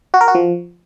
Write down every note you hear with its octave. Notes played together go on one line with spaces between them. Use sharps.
F#4
A#4
F#4
F3